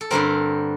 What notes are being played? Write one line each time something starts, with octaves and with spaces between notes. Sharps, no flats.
A4
G2 D3 G3 C4 A#4